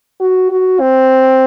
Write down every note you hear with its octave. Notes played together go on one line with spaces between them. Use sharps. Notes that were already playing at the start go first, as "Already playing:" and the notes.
F#4
F#4
C4